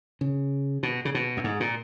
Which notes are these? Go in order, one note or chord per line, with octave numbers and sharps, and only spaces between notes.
C#3
B2
C#3
B2
F#2
G#2
A#2